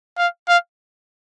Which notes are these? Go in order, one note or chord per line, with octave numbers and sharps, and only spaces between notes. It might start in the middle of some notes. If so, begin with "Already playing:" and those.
F5
F5